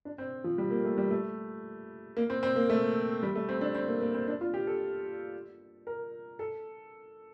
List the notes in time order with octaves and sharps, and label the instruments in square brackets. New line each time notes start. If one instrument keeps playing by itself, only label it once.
[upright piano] D4
C4
F3
G3
A#3
A3
G3
A3
A#3
C4
C4
A#3
A3
G3
A3
C4
D4
C4
A#3
A#3
C4
D4
F4
G4
A4
A#4
A4